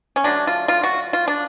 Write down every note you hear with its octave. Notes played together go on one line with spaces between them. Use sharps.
C#4
D3 F#3 A3 D4
F4
F4
F#4
F4
D4